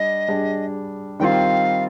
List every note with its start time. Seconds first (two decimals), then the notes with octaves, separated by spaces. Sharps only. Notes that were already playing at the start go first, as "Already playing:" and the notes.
Already playing: G3 D4 D#5
0.28 G3 D4 G#4
1.20 D#3 G3 C4 F4 F5 G5